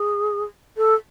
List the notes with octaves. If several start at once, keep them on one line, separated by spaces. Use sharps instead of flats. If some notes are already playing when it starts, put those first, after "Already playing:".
Already playing: G#4
A4